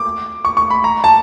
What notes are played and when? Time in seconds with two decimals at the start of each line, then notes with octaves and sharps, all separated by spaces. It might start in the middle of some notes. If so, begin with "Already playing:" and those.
Already playing: D6
0.45 C#6
0.57 C#6
0.70 B5
0.84 A#5
1.04 A5